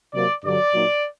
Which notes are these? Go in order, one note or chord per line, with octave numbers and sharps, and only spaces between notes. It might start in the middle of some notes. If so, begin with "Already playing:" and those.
C3 F#3 A#3 D5
G2 D3 F#3 D5
A#2 F#3 A#3 D#4